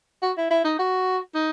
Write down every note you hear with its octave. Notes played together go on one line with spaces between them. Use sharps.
F#4
E4
E4
D#4
F#4
D#4